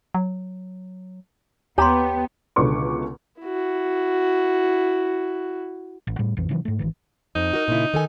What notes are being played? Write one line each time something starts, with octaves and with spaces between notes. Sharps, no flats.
F#3
D#2 B3 G4 C#5 A#5 C6
C#2 B2 D3 B4 C#6 D6
E4 F#4
A1
A2 G3
A#1 F2 E3
C3 D#3 E3 F#3
G#2 A3
G#1 D#3 E3
F2 D#4
F#4 A#4
A#2 C#3 E4
D#3 A4 G#5